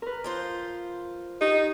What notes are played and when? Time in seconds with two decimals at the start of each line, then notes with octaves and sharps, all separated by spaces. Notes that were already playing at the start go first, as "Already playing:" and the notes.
0.02 A#4 B4
0.24 F3 F4 C5
1.41 D#4 G4